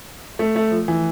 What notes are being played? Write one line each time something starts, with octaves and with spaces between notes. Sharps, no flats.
A3
A3
F3
E3